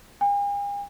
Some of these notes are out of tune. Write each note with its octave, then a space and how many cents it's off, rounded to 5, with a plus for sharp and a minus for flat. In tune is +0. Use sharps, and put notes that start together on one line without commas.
G#5 -45